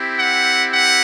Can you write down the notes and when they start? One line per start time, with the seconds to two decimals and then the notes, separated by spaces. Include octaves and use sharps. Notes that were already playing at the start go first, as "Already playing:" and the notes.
Already playing: C4 E4 G4
0.18 F#5
0.73 F#5